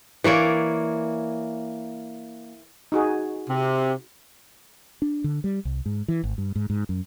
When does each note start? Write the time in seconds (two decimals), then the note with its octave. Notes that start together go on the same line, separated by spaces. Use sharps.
0.24 E3 A#3 C#5 D5
2.92 D#4 F#4 G#4
3.50 C3
5.02 D4
5.24 D3
5.44 G3
5.65 C2
5.86 G#2
6.08 E3
6.24 G#1
6.38 G2
6.56 G#2
6.70 G#2
6.89 F#2